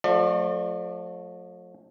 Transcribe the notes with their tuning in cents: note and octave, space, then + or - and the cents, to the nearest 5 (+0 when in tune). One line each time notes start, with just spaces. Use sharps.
F3 +45 A3 +0 D5 +40